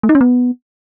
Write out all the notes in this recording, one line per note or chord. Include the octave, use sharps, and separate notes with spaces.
A3
D#4
C#4
B3